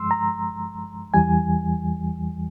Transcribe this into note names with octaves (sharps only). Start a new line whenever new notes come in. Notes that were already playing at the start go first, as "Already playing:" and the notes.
Already playing: G2 F3 G#3 C6 E6
A#5
E2 E3 G3 G#5